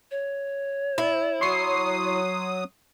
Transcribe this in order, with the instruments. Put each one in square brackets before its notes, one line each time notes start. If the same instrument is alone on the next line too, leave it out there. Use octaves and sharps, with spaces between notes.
[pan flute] C#5
[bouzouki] E4
[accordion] F#3 D#6 [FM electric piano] C6 C#6 C7